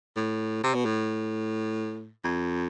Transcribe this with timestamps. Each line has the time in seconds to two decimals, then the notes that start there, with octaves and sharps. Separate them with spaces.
0.16 A2
0.64 C3
0.74 B2
0.85 A2
2.24 F2